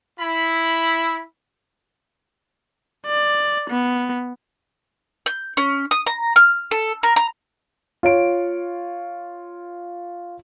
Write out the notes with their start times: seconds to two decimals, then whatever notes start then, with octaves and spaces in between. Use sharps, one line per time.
0.20 E4 B5
3.07 D5
3.70 B3
5.26 G6
5.57 C#4
5.91 D#6
6.07 A#5
6.36 F6
6.71 A4
7.03 A#4
7.16 A#5
8.03 F4 C#5 D7